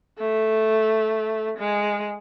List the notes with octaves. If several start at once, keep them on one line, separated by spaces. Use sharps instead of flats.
A3
G#3